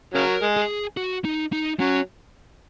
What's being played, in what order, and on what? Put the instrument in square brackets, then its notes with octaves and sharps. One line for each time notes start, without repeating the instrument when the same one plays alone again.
[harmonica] C#3 F#3 [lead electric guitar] A#4
[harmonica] G#3
[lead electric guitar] G#4
F#4
D#4
D#4
[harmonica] F#3 [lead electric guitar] C#4